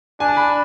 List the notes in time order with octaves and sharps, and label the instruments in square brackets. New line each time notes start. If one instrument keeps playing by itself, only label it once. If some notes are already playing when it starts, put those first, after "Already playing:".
[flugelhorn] D4 [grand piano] G#5
[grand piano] A5
B5